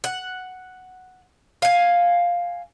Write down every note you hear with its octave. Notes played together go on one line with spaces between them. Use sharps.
F#5
F5 G#5